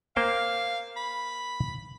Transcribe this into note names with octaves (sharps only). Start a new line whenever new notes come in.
A#3 C5 F5 G5
B5